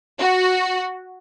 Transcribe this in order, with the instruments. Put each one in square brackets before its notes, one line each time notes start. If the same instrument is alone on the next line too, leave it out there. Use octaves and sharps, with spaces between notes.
[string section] F#4